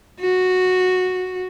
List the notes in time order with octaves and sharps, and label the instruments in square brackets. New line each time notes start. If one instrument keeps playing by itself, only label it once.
[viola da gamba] F#4